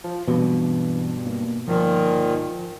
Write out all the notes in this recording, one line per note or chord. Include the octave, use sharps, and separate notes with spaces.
F3
G2 B2 E3 F#3 C4
A#3
G1 A#2 D#3 F3